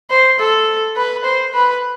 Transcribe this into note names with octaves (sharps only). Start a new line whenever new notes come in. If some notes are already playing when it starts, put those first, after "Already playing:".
C5
A4
B4
C5
B4